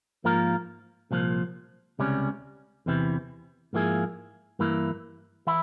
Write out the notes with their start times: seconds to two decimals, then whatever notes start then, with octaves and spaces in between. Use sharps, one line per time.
0.24 G#2 F3 A#3 F4 A#4
1.11 C2 A#2 F3
1.99 C#2 C3 G3 C#4
2.86 E2 C3 E3
3.73 G#2 F3 A#3 E4 G#4
4.59 G2 E3 A#3 E4
5.47 E3 E4